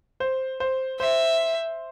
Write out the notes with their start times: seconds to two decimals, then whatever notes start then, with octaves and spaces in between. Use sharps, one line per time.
0.20 C5
0.60 C5
1.00 C5 E5